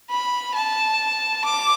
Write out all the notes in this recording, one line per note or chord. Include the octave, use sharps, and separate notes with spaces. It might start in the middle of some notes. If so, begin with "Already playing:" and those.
B5
A5
D6